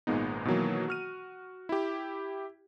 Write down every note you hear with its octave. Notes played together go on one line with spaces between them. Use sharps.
G#1 A#2 G#3 B3 D#4
B2 D#3 E3 F#3 A#3
F#4 F6 D#7
E4 G4